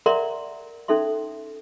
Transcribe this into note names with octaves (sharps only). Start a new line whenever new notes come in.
A#4 D5 E5 F#5 A#5 C6
C#4 D#4 A4 E5 C6